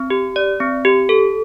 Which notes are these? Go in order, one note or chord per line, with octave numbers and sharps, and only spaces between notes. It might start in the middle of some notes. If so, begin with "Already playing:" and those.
Already playing: C4
G4
D5
C4
G4
A4